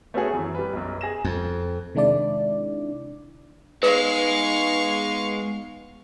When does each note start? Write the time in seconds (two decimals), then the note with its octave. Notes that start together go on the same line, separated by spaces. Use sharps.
0.14 A3 B3 C#4 F#4 G#4
0.33 F#2 E3
0.55 G3 B4
0.73 B1 F#2
1.01 G#4 A#6 E7
1.24 F2
1.95 C3 D#3 G#3 D4 E4 D5
3.83 G#3 B3 D#4 B4 F5 C#6